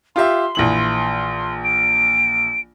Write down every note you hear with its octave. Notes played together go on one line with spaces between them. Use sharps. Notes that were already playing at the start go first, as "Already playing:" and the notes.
F4 G4 E5 C6
A#1 E3 F#7
D7